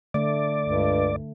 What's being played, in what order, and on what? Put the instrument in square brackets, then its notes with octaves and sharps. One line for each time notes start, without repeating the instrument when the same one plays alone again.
[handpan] D3 A3 [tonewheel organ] D5
[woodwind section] C#2 G2